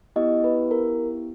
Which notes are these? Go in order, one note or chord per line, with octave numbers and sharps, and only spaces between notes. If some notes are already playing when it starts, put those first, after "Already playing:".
B3 E4 G4 D#5
B4
A#4